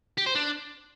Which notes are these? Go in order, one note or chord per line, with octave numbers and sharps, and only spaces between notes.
G4
C5
D4